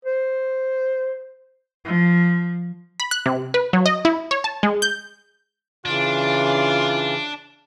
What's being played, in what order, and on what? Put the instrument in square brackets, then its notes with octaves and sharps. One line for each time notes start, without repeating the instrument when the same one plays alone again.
[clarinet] C5
[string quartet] F3
[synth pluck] B5
F#6
C3
B4
F#3
D#5
E4
C#5
A5
G#3
G6
[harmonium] C#3 E3 [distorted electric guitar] D4 [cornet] F4